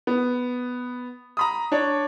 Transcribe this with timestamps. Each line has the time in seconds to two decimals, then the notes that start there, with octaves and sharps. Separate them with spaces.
0.07 B3
1.37 A#5 B5 D#6
1.72 D4 C#5 D5